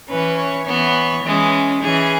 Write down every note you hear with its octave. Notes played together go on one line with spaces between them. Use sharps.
E3 C#4 B4
C#5
E3 B3 C#5
E3 G#3 C#4
E3 C#4 G#4